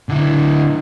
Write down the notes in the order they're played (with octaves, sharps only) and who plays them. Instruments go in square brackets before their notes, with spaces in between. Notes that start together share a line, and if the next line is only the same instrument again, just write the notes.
[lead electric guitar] D3 E4